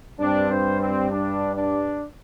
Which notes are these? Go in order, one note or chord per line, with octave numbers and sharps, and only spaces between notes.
G2 G3 C4 D4
C5
C4
D4
D4